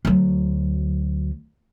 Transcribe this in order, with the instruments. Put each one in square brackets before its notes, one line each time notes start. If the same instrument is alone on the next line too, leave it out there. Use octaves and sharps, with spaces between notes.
[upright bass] D2 F#3